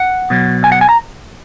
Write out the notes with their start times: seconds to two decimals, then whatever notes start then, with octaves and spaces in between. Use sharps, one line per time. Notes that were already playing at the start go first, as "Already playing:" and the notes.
Already playing: F#5
0.30 B2 F#3
0.64 G#5
0.72 F#5
0.81 G#5
0.89 A#5